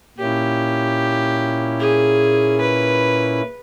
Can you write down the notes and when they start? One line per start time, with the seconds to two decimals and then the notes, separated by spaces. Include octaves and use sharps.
0.18 A#2 A#3 C#4 E4 G4
1.80 G#4
2.61 B4